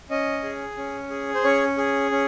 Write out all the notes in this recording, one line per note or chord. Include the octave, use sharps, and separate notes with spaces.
C#4 D#5
G#4
C#4
G#4
C5
C#4 C#5
G#4
C#4